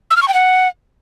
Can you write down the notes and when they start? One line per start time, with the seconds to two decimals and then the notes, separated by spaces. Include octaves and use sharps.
0.10 E6
0.16 F6
0.22 C#6
0.28 G5
0.34 F#5